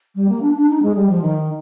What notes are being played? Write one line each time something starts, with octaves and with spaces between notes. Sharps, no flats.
G3
A#3
D4
D4
D#4
G#3
G3
F3
D#3